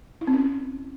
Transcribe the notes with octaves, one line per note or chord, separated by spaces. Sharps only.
E4
C4
C#4